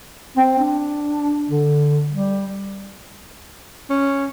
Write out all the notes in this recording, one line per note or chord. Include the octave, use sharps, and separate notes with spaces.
C4
D4
D3
G3
C#4